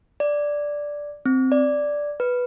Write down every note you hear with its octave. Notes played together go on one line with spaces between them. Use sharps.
D5
C4
D5
B4